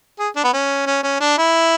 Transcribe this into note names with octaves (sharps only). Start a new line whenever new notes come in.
G#4
D4
B3
C#4
C#4
C#4
D4
E4